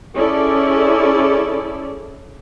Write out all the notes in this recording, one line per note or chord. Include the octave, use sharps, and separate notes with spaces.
C#4 E4 G#4 A4 D5